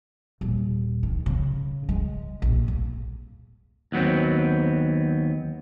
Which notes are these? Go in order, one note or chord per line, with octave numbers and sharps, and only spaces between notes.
D#1
D#3
C#3
G#3
A#1
F2
D#2 F#3 B3 C4